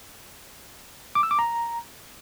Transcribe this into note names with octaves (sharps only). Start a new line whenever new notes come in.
D6
E6
D6
A#5